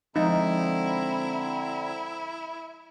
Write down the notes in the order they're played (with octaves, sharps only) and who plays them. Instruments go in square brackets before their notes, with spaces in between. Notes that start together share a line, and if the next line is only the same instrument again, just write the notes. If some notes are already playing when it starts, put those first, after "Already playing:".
[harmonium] D3 C4 A#5 [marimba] F3 G#3 [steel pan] D#4 [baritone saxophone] E4